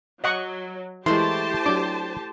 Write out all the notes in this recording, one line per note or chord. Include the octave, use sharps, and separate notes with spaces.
F#3 D#5 F#5 C#6
E3 G#3 A3 E4 G4 C5 A5 C6
F#3 D4 D6